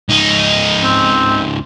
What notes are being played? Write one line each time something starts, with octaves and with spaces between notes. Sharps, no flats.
C#2 D#4
C4